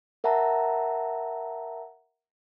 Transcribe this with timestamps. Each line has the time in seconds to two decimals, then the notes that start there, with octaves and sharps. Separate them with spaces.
0.24 A#4 E5 F#5 A5 A#5